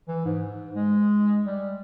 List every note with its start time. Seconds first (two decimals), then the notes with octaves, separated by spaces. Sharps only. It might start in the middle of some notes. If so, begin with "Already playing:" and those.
0.08 E3
0.25 G#2
0.75 G#3
1.47 G3